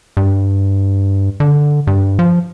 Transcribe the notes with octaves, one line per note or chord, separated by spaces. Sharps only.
G2
D3
G2
F3